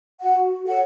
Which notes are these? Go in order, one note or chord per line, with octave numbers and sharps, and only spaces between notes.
F#4 F#5
A4 C#5 F#5